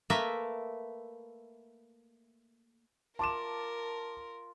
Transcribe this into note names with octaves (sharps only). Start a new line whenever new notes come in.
A3 A#3 A#4 B4 E5
F4 A#4 A5 D6 E7